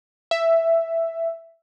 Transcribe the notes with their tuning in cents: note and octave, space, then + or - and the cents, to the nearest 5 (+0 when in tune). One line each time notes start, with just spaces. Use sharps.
E5 +5